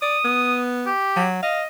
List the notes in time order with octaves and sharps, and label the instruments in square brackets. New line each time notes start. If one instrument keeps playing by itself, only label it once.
[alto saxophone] D5 [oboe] D#6
[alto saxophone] B3
[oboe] G4
[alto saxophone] F#3
[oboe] D#5 [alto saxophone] F5